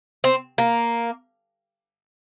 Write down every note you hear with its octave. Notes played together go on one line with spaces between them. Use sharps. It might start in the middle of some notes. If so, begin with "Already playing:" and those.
C4
A#3